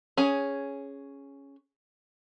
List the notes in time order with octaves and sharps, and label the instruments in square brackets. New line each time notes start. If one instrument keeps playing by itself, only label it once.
[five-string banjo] C#4 G#4